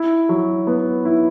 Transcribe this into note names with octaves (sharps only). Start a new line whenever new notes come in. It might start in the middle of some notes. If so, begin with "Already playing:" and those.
Already playing: E4
F#3
B3
E4